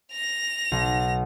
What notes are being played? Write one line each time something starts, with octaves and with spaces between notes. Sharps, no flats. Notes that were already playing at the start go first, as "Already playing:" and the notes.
A#6 F7
B1